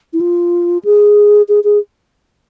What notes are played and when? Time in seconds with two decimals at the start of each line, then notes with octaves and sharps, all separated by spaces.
0.13 E4
0.21 F4
0.85 G#4
1.48 G#4
1.64 G#4